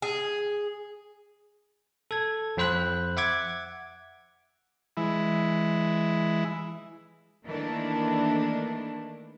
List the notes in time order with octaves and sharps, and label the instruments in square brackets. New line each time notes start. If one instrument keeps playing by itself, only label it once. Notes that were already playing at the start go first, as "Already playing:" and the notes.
[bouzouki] G#4
[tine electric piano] A4 G#6
F2 C4 C5 B5 F#6
E5 F#5 D6 G#6
[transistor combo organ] E3 G#3 E4
[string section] D#3 E3 A3 A#3 D4